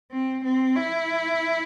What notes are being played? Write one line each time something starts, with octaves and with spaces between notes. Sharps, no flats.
C4
C4
E4